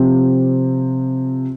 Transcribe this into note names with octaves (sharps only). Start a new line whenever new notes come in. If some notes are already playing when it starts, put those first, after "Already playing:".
Already playing: C3 F3 C4